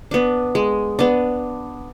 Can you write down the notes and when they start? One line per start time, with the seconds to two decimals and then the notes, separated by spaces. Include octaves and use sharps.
0.11 B3 D4
0.55 G#3
0.99 B3 D4